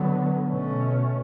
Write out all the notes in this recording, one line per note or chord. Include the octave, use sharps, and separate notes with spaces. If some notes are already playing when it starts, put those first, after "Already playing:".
Already playing: D3 F#3 B3
B2 A3 C#4